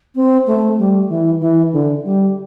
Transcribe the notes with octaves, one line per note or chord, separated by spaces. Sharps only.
C4
A3
G3
E3
E3
D3
G3